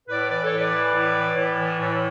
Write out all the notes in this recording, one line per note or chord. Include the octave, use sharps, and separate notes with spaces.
A2 B4 D5
E3 B4 D5
A4 C#5
A2
B4 D5
E3
A2
E3
A2
E3
A2